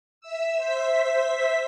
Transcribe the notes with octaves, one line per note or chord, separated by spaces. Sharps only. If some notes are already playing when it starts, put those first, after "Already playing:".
E5 E6
C5 E5 B6